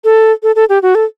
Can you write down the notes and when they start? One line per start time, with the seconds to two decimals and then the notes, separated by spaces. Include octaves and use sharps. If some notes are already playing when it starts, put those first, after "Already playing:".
0.04 A4
0.43 A4
0.56 A4
0.69 G4
0.82 F#4
0.95 A4